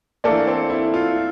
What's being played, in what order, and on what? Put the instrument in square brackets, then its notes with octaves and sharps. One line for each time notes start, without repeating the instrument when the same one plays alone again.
[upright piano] E3 A3 D4 A4 D5 [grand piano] A#3
[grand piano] C4
E4
F4